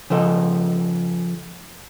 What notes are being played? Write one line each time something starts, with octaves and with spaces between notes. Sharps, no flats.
C#3 F3 A4 D#5